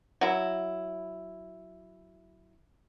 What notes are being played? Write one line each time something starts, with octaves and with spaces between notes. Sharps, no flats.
F#3 E4